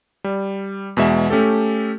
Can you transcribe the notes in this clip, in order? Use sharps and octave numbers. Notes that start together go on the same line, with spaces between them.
G3
E2 B2 G#3 E5
A3 C#4 G4 A4